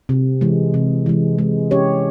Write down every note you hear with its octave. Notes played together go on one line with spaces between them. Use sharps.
C3
E3 G#3
C3
E3 G#3
G#3
C#4 G4 C#5